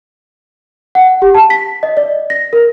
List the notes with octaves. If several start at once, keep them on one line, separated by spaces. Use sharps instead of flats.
F#5
G4
A5
B6
D#5
D5
A#6
A#4